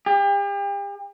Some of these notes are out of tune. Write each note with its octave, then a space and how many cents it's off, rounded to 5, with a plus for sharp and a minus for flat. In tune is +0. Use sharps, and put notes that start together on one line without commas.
G4 +40